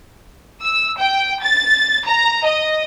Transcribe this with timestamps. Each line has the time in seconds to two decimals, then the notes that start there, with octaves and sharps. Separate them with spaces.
0.63 E6
0.98 G5
1.43 A6
2.07 A#5
2.44 D#5